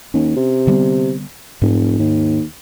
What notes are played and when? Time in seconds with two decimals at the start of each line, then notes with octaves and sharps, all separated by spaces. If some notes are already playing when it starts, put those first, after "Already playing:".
0.14 D#2 C#4
0.36 C3
0.67 D3 G3 B3
1.62 F1 G#2
1.99 D#2